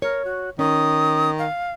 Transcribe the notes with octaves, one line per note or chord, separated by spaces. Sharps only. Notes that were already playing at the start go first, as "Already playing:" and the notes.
A#4 C#5
F#4
D#3 C#4 D#6
F5